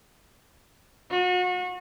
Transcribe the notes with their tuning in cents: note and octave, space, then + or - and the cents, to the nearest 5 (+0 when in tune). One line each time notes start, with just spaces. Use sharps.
F#4 -35